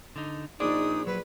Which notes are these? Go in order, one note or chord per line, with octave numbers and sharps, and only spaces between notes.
D3 D#4
A#1 D4 D#4 G#4 D5 D#6
F#3 B4